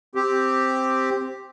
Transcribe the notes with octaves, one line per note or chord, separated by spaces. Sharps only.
C4 G4